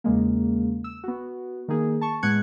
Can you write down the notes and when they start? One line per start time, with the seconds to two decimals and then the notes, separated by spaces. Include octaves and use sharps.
0.04 E2 C#3 G#3 A#3
0.84 E6
1.04 B3 F#4
1.68 D#3 A#3 D#4 G#4
2.01 A5 C#6
2.23 A2 G#3 B3 F#6 G#6 C#7